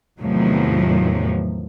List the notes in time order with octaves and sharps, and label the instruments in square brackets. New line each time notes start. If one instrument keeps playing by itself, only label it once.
[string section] E2 A2 C3 D#3 F3 F#3